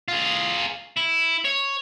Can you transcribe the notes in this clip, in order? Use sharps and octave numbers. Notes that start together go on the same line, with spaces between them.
F4 G#4
E4
C#5